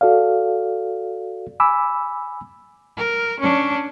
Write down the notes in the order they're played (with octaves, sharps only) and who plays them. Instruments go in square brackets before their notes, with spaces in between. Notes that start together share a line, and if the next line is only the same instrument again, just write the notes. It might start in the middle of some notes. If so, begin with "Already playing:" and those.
[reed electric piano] F#4 A4 D5 F5
G#5 B5 D6 E6
[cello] A#4
C#4 D4